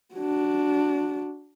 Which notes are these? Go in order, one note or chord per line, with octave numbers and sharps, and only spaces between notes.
D4 F#4